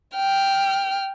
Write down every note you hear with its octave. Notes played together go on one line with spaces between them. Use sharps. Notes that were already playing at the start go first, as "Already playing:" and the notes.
G5 F6